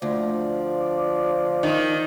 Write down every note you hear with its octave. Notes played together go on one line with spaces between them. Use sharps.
D2 F3 D5
D#3